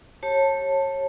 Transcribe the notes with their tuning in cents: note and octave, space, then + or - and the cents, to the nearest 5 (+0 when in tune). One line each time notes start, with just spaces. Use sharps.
G4 +0 C#5 -25 A5 +10